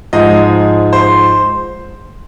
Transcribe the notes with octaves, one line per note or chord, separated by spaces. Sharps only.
G#2 F3 G#3 D#5
C5